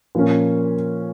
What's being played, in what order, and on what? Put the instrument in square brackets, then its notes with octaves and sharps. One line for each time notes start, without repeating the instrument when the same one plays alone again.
[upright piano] A#2 F3 A#3 C#4